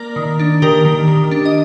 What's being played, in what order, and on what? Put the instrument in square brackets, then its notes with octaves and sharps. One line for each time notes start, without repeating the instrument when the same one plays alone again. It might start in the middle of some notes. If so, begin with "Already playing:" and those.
Already playing: [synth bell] A#3 A#4 D5
D#3
D4
D#3 G4 A#4
D#3
D#3
D4
D#5